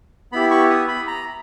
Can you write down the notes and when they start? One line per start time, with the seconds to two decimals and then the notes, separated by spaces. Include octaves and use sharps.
0.32 B3 E4 G4 B5
0.51 C#6
0.70 D#6
0.88 B5
1.07 A#5